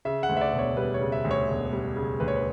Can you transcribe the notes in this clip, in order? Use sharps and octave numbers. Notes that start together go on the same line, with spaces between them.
C#3 E5
F#5
D2
E5
D5
E1
C#5
G3 B4
C#5
C#3
E5
D2
C#5
E1
G3
C#3
D2 B4
C#5
B4